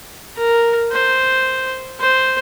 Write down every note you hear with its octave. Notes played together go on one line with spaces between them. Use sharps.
A#4
C5
C5